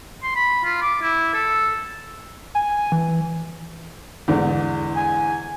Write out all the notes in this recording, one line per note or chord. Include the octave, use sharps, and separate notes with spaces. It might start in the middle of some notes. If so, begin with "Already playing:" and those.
C6
B5
F4
D6
E4
A4
G#5
E3
E2 G#2 D3
G#5